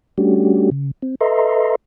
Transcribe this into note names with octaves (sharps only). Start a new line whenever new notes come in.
G3 A3 C#4 D4 F#4 G4
C#3
C4
A4 B4 D#5 E5 A#5 C6